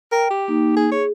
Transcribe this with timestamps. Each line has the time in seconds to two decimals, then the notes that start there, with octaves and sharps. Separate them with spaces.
0.12 A#4 G5
0.30 G4
0.48 A#3 D#4
0.76 G#4
0.91 G#4 C#5